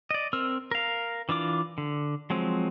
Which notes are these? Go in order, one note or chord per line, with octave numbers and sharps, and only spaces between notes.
D5 D#5
C4 A#4 E6 F6
A#4 F5
E3 D4 F4 D6
D3
F3 F#3 G#3 C4